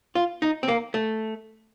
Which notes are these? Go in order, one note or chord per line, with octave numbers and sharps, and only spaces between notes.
F4
D#4
C4
A#3
A3